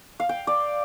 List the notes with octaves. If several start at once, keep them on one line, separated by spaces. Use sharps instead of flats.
F5
G5
D5